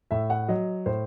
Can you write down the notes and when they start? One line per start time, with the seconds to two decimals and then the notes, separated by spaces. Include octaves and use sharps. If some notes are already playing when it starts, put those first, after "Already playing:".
0.11 A2 E5
0.30 F#5
0.48 F#3 D#5
0.86 A2 C5